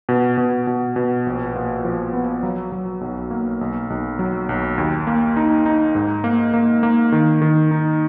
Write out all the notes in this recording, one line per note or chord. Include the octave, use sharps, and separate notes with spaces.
B2
B2
B2
B2
A#1
A#2
F3
B3
F#3
F#3
B1
A#3
B1
B1
F#3
B1
D#2
A#3
D#4
D#4
G#2
A#3
A#3
A#3
D#3
D#3
D#4